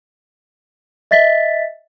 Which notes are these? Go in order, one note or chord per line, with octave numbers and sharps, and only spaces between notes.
D#5 E5 A6 B6